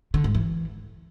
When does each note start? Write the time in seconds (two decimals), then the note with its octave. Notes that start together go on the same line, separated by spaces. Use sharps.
0.14 D3
0.24 G#2
0.35 E3